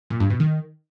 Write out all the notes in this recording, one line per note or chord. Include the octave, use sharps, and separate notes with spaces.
A#2
G2
B2
D#3